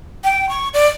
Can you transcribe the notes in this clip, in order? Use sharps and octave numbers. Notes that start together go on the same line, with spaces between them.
G5
C#6
D5